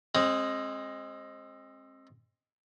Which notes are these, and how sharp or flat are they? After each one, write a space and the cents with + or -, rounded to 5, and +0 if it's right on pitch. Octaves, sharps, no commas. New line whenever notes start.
G#3 +0 C4 +35